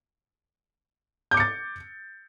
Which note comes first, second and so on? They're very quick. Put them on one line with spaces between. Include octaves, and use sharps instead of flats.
G6 D6 C#7 A6